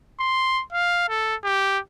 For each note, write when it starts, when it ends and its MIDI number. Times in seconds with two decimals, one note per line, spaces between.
0.20 0.63 84
0.73 1.06 77
1.09 1.36 69
1.44 1.79 67